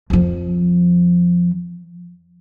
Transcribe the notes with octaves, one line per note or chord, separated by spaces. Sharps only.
F2 F3